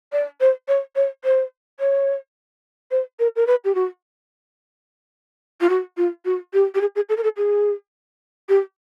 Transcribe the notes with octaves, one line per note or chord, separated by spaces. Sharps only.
D5
C5
C#5
C#5
C5
C#5
C5
A#4
A#4
B4
G4
F#4
F4
F#4
F4
F#4
G4
G4
G#4
G#4
A4
A#4
A4
G#4
G4